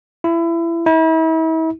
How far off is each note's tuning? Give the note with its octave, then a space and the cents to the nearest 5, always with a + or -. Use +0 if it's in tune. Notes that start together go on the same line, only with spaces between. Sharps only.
E4 +25
E4 -40